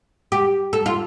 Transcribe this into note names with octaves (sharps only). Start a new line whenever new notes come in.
G4
A4
F4